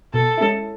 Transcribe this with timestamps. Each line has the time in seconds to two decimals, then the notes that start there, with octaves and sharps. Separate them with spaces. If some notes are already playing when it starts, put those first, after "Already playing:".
0.14 B2 A4
0.37 G#3 C#4 E4